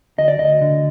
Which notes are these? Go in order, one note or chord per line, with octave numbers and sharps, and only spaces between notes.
D2 D#5
D5
D2 D#5
D3